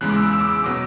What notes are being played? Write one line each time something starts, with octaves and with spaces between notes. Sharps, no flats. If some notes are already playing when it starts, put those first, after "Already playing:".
E2 C#3 G#3 F#6
D6
E6
E6
D6
E6
B2 F#3 D6